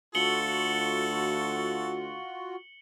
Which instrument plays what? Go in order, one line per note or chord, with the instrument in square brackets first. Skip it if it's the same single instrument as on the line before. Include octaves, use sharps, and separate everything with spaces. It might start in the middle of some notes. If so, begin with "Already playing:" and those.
[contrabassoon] D2 [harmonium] F4 F#4 [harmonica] A4 [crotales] C#7 F#7 G7